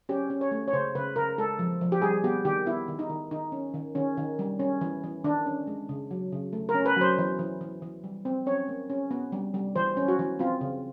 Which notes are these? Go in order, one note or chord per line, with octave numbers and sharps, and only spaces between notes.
C#4 G4
C#4
C#5
A3
C#5
C#3 C5
C#3 B4
C#3 A#4
G#3 A4
F3
F3
G4
G3 G#4
B3 G4
D#3 G4
B3 E4
D#3
D#4
D#3
D#3 D#4
C#4
D#3
D#3 C#4
D#3
G3
C#4
E3
E3
D#3 D4
C#4
G#3
C#3
F#3
C#3
A3
A#4
C#4
B4
F#3 C5
E3
E3
E3
E3
G3
C4
C#4 C#5
A#3
C#4
B3
G3
G3
E3 C5
C#4
F#4
E3
C4 F4
C#3